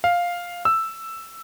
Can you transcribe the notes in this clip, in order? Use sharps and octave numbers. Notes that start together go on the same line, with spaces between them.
F5
E6